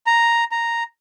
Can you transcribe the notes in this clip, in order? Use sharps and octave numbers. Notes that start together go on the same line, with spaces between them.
A#5
A#5